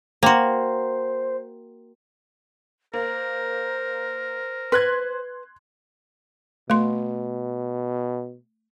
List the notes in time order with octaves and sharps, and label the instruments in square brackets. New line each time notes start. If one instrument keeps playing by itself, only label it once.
[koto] A#3 F#4 [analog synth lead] C5 [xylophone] G5 A#5 C6
[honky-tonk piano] A#3 [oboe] A#4 [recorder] C5
[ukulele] B4 [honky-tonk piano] C6 F#6 G#6
[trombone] B2 [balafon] A3 C6